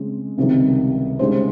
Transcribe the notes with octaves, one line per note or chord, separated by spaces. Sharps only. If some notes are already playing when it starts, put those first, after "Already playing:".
Already playing: C#3 G#3 C4
C#2 C3 D#3 G3
C#3 G#3 D#4 G4 C5